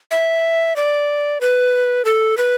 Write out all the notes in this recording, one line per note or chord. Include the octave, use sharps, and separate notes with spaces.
E5
D5
B4
A4
B4